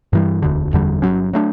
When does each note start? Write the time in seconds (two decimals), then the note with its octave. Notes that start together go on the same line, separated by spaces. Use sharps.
0.13 G2 E3 G3
0.42 E1 D2 D3
0.73 F#1 E2 D3 G3
1.02 G1 G2 F#3 C#4
1.33 F#3 A3 D4